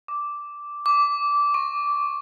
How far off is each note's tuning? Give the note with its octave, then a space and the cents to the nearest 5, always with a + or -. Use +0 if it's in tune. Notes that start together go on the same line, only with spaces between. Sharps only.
D6 -5
D6 -15
C#6 -25